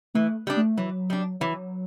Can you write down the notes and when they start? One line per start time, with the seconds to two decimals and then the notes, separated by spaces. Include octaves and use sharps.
0.14 E3 A3
0.47 G3 D4
0.57 A3
0.78 E3 F#3
1.10 G3 D4
1.40 E3 F#3